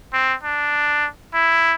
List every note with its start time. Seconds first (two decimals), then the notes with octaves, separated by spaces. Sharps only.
0.13 C4
0.43 D4
1.34 E4